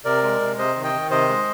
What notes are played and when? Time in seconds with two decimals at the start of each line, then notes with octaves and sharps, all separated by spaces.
0.05 C3 A#4 D5
0.23 G#3
0.41 C3
0.58 C3 C5 D#5
0.76 D#3
0.84 D#5 G5
0.94 D#3
1.11 C3 C5 D#5
1.29 G#3